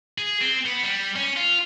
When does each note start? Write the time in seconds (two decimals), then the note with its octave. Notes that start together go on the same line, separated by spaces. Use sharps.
0.18 G#4
0.41 C4
0.66 B3
0.83 G3
1.16 C#4
1.37 F4